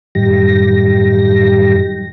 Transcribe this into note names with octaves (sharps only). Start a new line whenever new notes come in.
F#2 A2 D#3 G3 G4 A#6